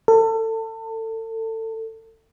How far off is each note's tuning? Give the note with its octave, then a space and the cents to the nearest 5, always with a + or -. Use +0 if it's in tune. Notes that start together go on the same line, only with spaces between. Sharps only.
A4 +30